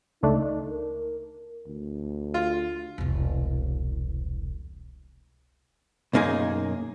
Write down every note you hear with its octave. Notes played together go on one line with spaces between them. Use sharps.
C#2 A3 D4 D#4
A#4
D2
F4
E1 C2
B1 F#2 A#3 D#4 G#4